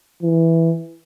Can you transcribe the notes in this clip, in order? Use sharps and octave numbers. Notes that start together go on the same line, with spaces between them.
E3